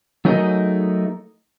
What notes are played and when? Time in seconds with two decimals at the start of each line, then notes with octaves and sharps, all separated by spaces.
0.25 F#3 A3 D#4 G#4 A#4 D#5